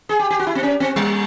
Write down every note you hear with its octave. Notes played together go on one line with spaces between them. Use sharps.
G#4
G4
G4
F#4
E4
C4
C#4
C4
G3